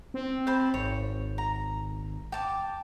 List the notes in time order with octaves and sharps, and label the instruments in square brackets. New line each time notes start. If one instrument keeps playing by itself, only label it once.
[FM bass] C4
[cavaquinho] C5 A5 B5
[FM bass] G#1 [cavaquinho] C#5
[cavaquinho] A#5
G5 A5 D6